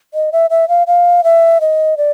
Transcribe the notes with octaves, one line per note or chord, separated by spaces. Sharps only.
D#5
E5
E5
F5
F5
E5
D#5
D5